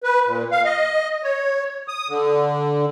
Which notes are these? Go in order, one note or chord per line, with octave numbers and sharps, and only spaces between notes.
B4
A#2
F5
D#5
C#5
D#6
D3